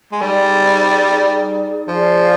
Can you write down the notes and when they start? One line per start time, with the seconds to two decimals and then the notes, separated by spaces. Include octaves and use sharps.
0.12 G#3
0.21 G3 D#4 G#4 D5
1.88 F3 G#4 D5 F5